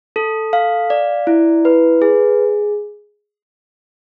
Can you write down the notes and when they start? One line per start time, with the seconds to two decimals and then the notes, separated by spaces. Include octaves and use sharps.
0.16 A4
0.53 F5
0.90 D5
1.27 E4
1.65 B4
2.02 G#4